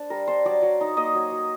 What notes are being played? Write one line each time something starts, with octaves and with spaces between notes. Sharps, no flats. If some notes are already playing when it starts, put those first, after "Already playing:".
Already playing: D4 C5
G3 A#4
D4 C5
F#3 D5
F#3
D#4
A#3 D#5
F#3
F#3